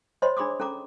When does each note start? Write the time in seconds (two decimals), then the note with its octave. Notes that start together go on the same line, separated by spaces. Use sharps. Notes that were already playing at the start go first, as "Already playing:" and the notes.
0.22 C5 C#5 D#5 B5 C6
0.37 D4 G#4 B5 C6 D6 D#6
0.60 C#4 A4 A#5 D6